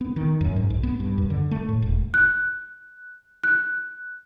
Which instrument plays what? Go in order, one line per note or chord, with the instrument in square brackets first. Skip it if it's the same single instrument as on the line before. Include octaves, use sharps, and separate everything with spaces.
[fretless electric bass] B3
D#3
F#2
G#2
B1
B3
G2
F#2
D3
A3
A2
E1
[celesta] F#6
F#6